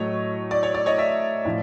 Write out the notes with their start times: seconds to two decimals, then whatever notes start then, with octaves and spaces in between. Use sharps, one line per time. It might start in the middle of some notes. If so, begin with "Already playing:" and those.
Already playing: A2 F#3 A3 C#5 D#5
0.51 D5
0.63 C#5
0.74 D5
0.86 C#5 D#5
0.98 D5 E5
1.45 A2 F3